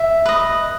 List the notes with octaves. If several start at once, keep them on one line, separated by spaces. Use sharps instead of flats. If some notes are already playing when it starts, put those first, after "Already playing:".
Already playing: E5
B4 D#5